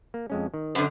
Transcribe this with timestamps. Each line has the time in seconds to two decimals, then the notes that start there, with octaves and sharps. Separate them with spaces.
0.14 A#3
0.30 F2 G#3 C#4
0.54 D#3
0.75 F#2 D3 B4 C5